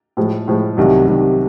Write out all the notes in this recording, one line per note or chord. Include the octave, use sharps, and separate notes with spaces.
A2 F3 G#3
A2 F3 G#3
C2 C3 D#3 F#3
C2 C3 D#3 F#3